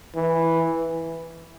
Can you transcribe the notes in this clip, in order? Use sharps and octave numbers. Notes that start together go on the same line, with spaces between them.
E3